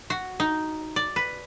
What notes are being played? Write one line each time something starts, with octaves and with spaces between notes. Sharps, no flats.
F#4
D#4
D5
B4